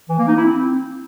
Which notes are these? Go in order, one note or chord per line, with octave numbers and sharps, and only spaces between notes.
E3
A#3
D#4
E4
C4